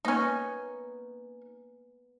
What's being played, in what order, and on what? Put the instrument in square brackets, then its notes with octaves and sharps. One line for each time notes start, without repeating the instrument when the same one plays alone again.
[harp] A#3 B3 G#5 [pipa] C#4 D#4